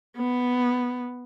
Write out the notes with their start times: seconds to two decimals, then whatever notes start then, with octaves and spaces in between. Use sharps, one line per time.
0.16 B3